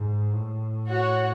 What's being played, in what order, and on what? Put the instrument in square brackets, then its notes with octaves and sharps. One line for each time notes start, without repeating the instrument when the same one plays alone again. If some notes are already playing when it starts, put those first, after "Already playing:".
Already playing: [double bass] G#2
A2
[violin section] F#4 C#5 F#5